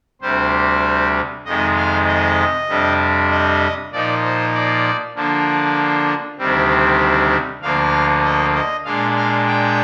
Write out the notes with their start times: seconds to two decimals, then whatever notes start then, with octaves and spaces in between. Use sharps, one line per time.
0.22 D2 C3 G3 C5
1.45 F2 C3 D#3 G#3 D#5
1.76 F5
2.07 D#5
2.68 F2 C3 G3 D4
3.30 D#5
3.92 A#2 F3 A#3 D#4 D5
4.23 C5
4.53 D5
5.15 D3 F3 A#3 D4
6.38 D2 C3 D#3 G3 C4
7.62 D2 D3 F3 A#3 F5
8.24 D#5
8.55 D#5
8.85 A#2 G#3 D4 F5
9.15 F5
9.47 G5